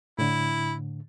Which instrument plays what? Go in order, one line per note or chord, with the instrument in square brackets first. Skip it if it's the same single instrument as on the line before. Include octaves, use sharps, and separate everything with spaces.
[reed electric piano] A2 D3 [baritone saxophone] E4